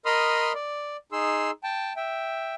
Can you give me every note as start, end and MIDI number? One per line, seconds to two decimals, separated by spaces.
0.05 0.53 70
0.05 0.53 75
0.05 0.53 83
0.05 0.53 84
0.05 0.53 87
0.05 0.53 89
0.54 0.97 74
1.12 1.51 63
1.12 1.51 68
1.12 1.51 84
1.12 1.51 88
1.64 1.93 79
1.64 1.93 81
1.96 2.55 76
1.96 2.55 79